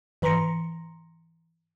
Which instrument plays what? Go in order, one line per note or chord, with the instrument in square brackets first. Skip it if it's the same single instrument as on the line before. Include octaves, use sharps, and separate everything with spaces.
[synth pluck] G#2 E3 A#5 C6 A#6 C#7